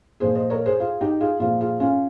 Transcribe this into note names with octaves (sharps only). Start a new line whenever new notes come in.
A#2 F3 G#4 C5
C5 D#5
A#4 C#5
G#4 C5
F4 G#4
D#4 G4
F4 G#4
A#2 F3 F4 G#4
F4 G#4
C#4 F4